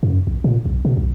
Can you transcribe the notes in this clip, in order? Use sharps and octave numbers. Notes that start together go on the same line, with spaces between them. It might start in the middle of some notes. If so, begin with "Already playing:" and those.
F#2
A#1
A#2
B1
B2
B1